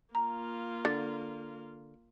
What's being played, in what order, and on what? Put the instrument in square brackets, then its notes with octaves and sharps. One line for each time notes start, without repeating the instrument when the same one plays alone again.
[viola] A#3 F4 [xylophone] A#5
[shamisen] D3 [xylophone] A6